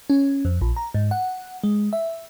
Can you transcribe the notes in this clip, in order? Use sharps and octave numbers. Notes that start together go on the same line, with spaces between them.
C#4
F2
A#1
A#5
G#2
F#5
G#3
E5